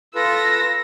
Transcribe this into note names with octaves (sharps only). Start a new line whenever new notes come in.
F4 A4 B4 E6 A#6